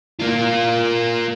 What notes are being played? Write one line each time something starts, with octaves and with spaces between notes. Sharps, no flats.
A#3 F4